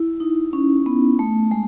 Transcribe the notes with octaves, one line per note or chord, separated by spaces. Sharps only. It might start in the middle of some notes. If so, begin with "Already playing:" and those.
Already playing: E4
D#4
C#4
B3
A3
G#3